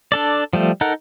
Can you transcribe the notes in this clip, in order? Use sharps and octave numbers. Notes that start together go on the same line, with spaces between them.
D4 A4 D5
F3 G3 A3
D#4 A4 A#4 F#5